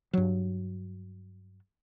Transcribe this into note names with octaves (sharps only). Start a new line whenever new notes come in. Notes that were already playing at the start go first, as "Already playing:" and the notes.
G2 F#3